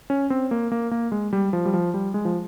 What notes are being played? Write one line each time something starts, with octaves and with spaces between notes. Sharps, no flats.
C#4
C4
A#3
A#3
A#3
G#3
G3
F3
G3
F3
G3
G#3
F3